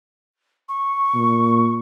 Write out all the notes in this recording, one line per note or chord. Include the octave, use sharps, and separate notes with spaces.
C#6
A#2